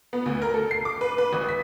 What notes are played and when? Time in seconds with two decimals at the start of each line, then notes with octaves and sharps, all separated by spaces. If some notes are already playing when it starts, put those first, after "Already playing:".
0.13 B3
0.26 D2
0.42 A#4
0.54 A4
0.71 C7
0.85 D6
1.01 B4
1.18 B4
1.33 G#1
1.49 B6